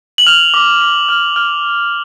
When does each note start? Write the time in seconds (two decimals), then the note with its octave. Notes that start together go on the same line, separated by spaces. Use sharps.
0.18 F#7
0.27 F6 F7
0.54 D6
0.81 D6
1.09 F6
1.36 F6